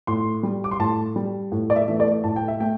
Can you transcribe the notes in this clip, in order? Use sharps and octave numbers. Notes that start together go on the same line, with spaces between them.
A2 C6
G3
D6
C6
A2 A5
G3
A2
D5
E5
E3 A3
D5
A2 A5
G5
E5
A3 G5